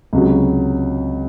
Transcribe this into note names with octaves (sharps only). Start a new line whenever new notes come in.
C#2 C3 F#3 C#4